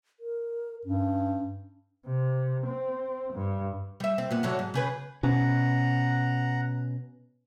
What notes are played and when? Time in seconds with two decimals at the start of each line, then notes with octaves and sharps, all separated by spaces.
0.20 A#4
0.85 G2 C#4
2.07 C3
2.66 C4
3.33 G2
4.00 G3 E5
4.18 C4
4.31 A#2 B3
4.43 A2 D3 F#3
4.59 G#2
4.74 C#3 G#4 B4
5.23 B2 C#4 F#5 A#5